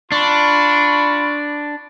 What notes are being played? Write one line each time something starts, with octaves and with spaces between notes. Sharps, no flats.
D4 F4 B5 C#6